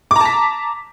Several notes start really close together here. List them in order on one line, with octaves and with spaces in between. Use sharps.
D6 A#5 A5 B6